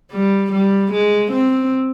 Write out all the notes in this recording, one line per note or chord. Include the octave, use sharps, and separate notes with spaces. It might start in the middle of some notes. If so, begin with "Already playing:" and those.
G3
G3
G#3
C4